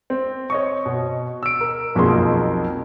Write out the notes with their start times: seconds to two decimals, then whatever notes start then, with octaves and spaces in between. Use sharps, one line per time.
0.10 C4
0.50 C#5 D#5 C#6
0.86 B2
1.43 E6 D7
1.61 A#4
1.95 B1 F2 B2 A#3 G#4 C6